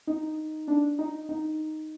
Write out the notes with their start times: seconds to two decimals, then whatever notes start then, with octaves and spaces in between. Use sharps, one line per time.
0.07 D#4
0.68 D4
0.99 D#4
1.29 D#4